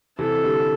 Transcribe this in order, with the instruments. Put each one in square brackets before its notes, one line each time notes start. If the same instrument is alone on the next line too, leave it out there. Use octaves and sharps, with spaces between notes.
[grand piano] C3 E3 [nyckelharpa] A4
[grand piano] D3 G3